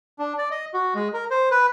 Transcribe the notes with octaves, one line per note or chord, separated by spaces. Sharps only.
D4
D5
D#5
F#4
G#3
A#4
C5
B4